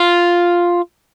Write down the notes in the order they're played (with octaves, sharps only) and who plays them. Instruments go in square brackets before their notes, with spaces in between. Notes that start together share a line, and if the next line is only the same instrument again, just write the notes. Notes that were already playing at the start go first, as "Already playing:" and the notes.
Already playing: [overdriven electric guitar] F4